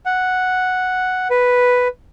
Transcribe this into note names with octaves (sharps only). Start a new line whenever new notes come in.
F#5
B4